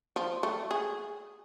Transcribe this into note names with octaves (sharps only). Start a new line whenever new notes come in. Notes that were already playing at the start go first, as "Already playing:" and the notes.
F3
A3
G#4